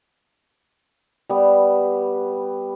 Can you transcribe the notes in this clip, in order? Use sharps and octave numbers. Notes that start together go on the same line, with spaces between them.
G3 B3